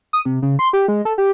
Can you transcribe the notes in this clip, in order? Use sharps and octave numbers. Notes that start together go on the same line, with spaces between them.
D#6
C3
C#3
C6
G4
G#3
A4
G4